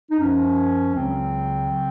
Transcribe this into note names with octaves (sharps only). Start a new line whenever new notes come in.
D#4
F#2 F3 C#4
C#2 C#3 F#3 C4
C#3 F#3